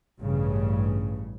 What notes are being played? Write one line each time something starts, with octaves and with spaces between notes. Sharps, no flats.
A1 G2 C#3